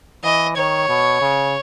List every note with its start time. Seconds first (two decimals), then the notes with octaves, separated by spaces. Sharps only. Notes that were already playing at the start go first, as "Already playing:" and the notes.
0.24 E3 D#5
0.57 D#3 C#5
0.89 B2
1.21 C#3